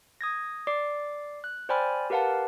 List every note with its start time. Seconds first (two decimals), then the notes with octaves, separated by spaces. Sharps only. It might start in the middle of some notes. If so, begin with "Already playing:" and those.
0.21 D#6 G#6 A#6
0.67 D5 D6 C7
1.44 F#6
1.69 C5 D5 G5 G#5 B5 F6
2.10 G4 A#4 B4 F5 F#5 A5